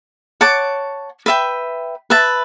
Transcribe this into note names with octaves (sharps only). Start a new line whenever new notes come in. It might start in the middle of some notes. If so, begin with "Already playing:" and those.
C#5 F#5 A5 D6
B4 E5 G5
B4 E5 A5